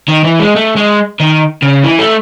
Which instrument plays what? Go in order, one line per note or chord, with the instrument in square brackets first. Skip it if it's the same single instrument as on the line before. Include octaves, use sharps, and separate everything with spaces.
[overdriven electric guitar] D#3
E3
G#3
A3
G#3
D#3
C#3
E3
A3